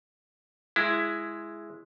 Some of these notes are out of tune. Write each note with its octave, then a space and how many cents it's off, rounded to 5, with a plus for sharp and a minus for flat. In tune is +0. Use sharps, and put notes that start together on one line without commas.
G#3 +0 E4 +10